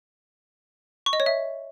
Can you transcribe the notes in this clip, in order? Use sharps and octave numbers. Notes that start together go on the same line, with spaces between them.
C#6
D#5
C#5
E5